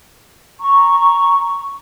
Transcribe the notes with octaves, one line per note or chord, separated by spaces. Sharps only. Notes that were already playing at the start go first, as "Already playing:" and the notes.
A#5 C#6